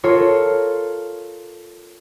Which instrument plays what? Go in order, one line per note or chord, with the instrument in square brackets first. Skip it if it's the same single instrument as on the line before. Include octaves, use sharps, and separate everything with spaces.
[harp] F4 A4 A#4 C#5